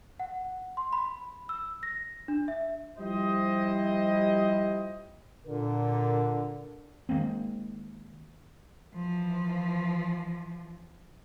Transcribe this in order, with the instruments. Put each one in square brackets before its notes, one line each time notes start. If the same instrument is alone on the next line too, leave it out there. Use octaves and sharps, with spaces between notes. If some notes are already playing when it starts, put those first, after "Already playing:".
[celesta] F#5
C6
B5
E6
A#6
D4
E5
[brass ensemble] F3 G3 E4 G4 C5 D#5
[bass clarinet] A#2 [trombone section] D3 [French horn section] A#4
[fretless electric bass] D#3 G#3 A#3 C4
[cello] E3 F3